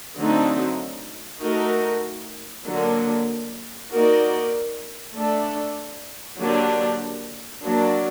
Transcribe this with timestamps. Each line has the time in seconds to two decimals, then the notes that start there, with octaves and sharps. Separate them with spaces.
0.17 D3 F#3 A3 C4 D#4
1.41 A3 D#4 F#4 A#4
2.66 D3 F#3 A#3
3.91 A#3 D#4 F#4 A#4 D5
5.15 A3 D4 A4
6.40 D3 F#3 A#3 D4 G4
7.64 F#3 A#3 D4